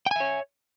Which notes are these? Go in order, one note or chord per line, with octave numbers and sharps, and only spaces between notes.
C#5 E5 G5 G#5